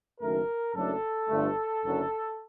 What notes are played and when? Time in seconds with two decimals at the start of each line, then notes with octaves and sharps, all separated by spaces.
0.20 F#1 F#2 D#3 A3 A#4
0.74 F#1 F#2 F#3 A3 D4 A4
1.29 G1 G2 D3 A3
1.83 F#1 F#2 D3 F#3